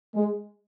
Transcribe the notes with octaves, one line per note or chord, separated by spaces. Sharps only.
G#3